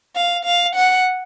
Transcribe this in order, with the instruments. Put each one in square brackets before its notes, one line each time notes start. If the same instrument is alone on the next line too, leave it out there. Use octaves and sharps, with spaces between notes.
[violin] F5
F5
F#5